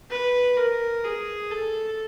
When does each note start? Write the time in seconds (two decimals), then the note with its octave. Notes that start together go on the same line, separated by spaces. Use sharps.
0.11 B4
0.57 A#4
1.04 G#4
1.51 A4